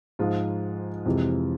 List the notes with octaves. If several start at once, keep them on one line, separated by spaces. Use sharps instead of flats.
G#2 F3 G#3 F4
F2 C3 E3 G#3